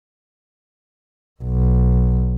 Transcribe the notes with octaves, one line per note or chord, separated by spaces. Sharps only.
B1